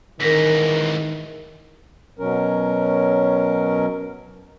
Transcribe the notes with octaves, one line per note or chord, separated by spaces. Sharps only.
G#2 D#3 E3 A#4 A#6 B6
B2 F#3 C#4 A#4